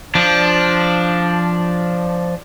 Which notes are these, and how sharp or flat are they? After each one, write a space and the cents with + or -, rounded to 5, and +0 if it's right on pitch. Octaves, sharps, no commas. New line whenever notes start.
F3 +0 D4 +0